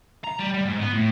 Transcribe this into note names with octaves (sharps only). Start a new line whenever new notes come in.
A#5
G3
G3
G#2
B3
A2